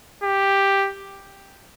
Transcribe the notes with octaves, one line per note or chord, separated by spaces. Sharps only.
G4